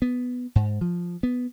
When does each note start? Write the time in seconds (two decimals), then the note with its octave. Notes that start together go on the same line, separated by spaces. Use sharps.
0.02 B3
0.56 G#2
0.81 F3
1.23 B3